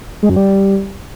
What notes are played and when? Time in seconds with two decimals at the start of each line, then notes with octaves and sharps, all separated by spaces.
0.23 G#3
0.29 F#2
0.36 G3